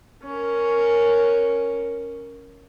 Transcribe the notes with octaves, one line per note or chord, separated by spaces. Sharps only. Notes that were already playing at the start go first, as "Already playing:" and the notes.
C#4 A#4